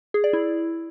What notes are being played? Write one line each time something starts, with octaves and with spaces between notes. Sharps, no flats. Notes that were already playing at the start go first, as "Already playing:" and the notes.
G#4
D5
E4